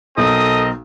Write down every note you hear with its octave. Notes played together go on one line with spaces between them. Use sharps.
B1 C4 A4 A#4 D#5 D#6